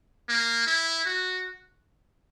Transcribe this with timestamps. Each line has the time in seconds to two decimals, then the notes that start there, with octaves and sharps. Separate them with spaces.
0.29 A#3
0.67 E4
1.05 F#4